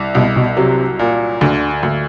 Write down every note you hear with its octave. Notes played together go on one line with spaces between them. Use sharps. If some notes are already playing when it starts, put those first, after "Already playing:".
Already playing: C2
C2 B2
B2
C3 F#3
A#2
D2 D3
D2